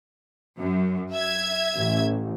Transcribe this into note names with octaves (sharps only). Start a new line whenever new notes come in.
F#2
E5 G#6
A1